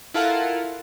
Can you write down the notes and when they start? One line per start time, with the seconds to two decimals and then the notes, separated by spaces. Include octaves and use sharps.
0.14 E4 F4 A4 A#4 F5 F#5